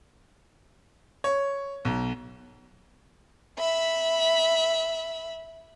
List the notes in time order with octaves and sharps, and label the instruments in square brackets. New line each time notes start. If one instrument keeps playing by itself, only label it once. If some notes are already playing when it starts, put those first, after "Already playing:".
[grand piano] C#5
B1
[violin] E5 B5